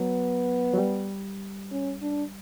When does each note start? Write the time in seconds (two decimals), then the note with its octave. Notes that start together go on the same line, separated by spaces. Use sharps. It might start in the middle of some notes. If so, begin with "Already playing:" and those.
Already playing: F#3 B3
0.73 F#3
0.78 G3
1.72 C#4
2.02 D4